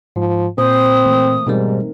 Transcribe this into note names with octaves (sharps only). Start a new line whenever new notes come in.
G#2 F3
A#2 C4 C5 D#6
E3 A3 A#3
G#2 B2 G3 C4 D#4 A#4